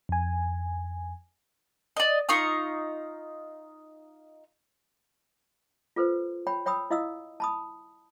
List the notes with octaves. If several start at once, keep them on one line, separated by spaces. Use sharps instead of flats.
F2 G#5
D5 D#5
D#4 F4 C#6 D#6
F4 A4 B4 C5
C#5 G5 B5
C#5 G5 B5 D#6 E6
E4 D#5 F5 D#6 E6
A5 B5 D#6